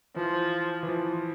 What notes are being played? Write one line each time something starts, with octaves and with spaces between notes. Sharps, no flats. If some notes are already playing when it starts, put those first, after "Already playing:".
E3 F3
E3
F3